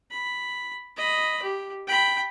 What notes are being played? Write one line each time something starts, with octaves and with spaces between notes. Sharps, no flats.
B5
D#5 B5
G4
G5 B5